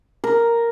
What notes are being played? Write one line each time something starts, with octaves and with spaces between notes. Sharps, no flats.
A#4